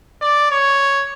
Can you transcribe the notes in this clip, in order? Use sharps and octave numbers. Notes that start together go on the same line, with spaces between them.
D5
C#5